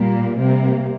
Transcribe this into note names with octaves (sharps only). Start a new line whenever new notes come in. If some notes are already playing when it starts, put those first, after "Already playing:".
Already playing: A#2 G3 A#3
C3 G3 A#3